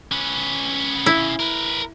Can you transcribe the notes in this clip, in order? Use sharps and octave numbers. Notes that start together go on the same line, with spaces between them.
C#4 B4
E4
A#4 B4